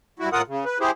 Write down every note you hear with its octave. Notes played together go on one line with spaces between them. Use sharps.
G2 E4 F#4
A2 F4 A#4 F#5 D#6
C#3
B4
E4 G4 G#4 C5